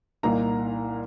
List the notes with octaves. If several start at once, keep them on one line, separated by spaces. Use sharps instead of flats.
C2 A#2 A#3 D#4 A#5